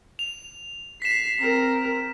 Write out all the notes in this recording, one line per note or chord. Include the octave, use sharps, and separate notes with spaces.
F7
B6 C7 E7
C4 A#4